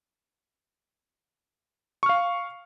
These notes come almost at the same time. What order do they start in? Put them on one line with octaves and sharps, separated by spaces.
C#6 F6 F5